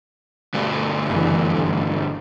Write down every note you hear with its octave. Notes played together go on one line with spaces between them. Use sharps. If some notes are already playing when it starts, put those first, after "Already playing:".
D2 G2
F#1 E3
G1